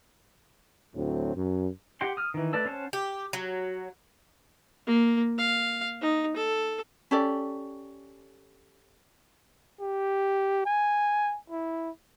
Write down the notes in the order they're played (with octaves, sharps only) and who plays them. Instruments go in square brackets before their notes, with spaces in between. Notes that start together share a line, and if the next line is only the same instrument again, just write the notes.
[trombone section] D2 A2 F#3 C4
F#2
[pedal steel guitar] G4 F#5 G5 C6
D#6 F6
D#3 E3
A3 B4 D5 A5 E6
C#4 C5 F#5 A5
[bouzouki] G4
F#3
[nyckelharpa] A#3
F5
D#4
A4
[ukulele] C#4 G4 A4 D5
[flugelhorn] G4
G#5
E4